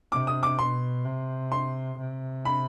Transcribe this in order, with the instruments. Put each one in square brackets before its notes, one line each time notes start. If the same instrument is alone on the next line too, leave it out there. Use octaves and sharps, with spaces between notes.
[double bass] C3 [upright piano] D6
[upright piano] D#6
D6
[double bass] B2 [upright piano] C6
[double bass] C3
[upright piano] C6
[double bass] C3
[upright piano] B5